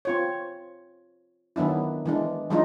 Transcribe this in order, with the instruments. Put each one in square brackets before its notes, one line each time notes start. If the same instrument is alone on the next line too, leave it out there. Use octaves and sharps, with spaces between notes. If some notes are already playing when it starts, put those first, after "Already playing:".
[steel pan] C4 F4 C#5
D#3 F#3 B3 D4 E4
E3 G#3 D4
E3 F#3 G#3 D4 D#4 F4